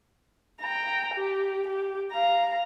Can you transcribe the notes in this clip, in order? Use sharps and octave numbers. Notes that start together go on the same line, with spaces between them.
G5 A#5
G4
G4
F5 A#5